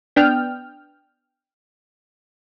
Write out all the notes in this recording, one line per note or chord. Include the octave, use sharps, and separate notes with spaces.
B3 D4 G5 F6